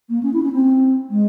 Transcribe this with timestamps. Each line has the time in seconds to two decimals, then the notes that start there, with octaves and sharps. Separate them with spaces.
0.09 A#3
0.23 C#4
0.33 E4
0.42 C#4
0.52 C4
1.10 G#3